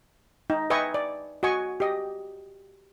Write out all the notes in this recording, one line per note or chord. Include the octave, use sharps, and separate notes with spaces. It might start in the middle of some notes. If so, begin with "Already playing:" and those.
D#4
B4 D#5 E5 G5 G#5 C#6
D5
F#4 D#5 G#5 C#6
G4 D#5